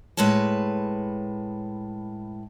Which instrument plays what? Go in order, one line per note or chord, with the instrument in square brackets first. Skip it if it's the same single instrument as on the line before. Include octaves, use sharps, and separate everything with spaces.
[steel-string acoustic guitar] A2 G#3 B4 C#5 A5